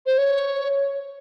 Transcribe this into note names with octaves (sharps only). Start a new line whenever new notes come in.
C5
C#5